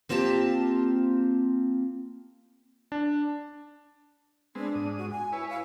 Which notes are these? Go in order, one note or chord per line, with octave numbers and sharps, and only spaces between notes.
A#3 C4 F4 G4 A5
D4
G#3 B3 C4 D4
G#2 D#6
F#4
G#5
E4 B4 C#5
F5